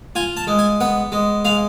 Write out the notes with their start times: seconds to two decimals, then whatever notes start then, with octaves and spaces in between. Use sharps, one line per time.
0.15 F4 G#5
0.37 A5
0.47 G#3
0.59 G#5
0.81 B3 F#5
1.12 G#3
1.45 G#3 F5